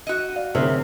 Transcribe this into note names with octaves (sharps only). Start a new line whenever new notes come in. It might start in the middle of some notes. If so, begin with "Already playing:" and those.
F#4 D#5
D5 F5
D1 C3 C#4 G#4 A#4 E5 F6